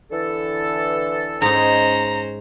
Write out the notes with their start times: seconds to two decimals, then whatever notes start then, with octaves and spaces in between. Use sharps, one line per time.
0.12 D3 E3 A4
1.42 G#2 C#4 D#4 C5 A#5